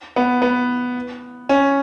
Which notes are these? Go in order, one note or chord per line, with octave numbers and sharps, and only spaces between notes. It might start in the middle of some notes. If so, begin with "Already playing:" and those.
B3
B3
C#4